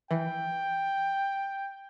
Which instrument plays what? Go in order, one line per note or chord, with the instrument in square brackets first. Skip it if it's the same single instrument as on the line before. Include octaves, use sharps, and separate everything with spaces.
[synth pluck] E3 [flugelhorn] G5